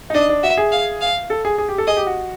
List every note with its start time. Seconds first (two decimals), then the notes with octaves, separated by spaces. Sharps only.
0.10 D#4
0.14 D4 D#5
0.29 D4
0.43 F#4 E5
0.57 G#4
0.72 F5
1.01 F5
1.30 A4
1.45 G#4
1.58 G#4
1.69 G4
1.78 A4
1.87 G#4 D#5
1.97 G4
2.07 F#4